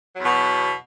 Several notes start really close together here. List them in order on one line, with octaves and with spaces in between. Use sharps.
F#3 E2 B2